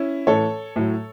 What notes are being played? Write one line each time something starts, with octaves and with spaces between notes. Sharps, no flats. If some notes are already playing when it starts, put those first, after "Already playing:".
Already playing: C#4 E4
A2 E3 A4 C#5
A2 F#3